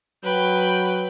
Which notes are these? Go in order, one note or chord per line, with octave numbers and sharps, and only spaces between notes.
F#3 B4 G5